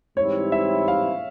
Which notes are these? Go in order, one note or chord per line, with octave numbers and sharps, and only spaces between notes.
G#2 E3 G3 C4 E4 C#5
E5
F5